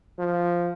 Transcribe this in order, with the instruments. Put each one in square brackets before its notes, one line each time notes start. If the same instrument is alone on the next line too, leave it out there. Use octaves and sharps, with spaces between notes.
[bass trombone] F3